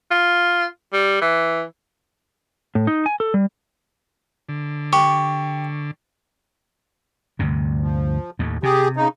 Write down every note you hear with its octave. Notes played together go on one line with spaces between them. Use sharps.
F4
G3
E3
A2
D#4
G#5
A4
G3
D3
G4 C#6
D2 G2 C3
F3
D#2 A2
C3 G4 G#4
C#3 D#4